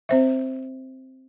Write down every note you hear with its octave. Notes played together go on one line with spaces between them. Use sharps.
C4 C5 E5